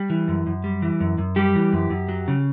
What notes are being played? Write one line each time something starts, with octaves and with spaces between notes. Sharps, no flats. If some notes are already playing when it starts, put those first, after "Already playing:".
Already playing: G3
E3
F#2
F#2
G3
E3
F#2
F#2
G3 G4
E3
F#2
F#2
F#3
C#3